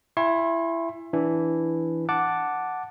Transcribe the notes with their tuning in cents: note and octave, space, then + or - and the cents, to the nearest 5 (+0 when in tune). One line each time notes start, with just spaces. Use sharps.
E4 +20 G#5 -30 C6 +45
E3 +0 D4 -10
F#5 +0 A5 +0 D6 +0